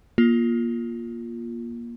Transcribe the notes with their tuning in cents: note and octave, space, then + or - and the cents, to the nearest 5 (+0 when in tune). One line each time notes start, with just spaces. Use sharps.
A#3 +25 F4 +0